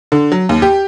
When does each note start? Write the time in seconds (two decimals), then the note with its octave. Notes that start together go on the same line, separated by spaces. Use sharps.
0.12 D3
0.32 F#3
0.49 D#2
0.62 G4